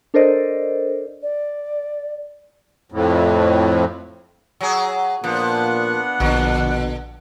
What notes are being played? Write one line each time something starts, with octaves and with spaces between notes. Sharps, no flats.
D4 A4 A#4 C5 D5 D#5
D5
F2 A2
F#3 G#4
A#2 F3 B3 D4 F#5
A#1 B2 D3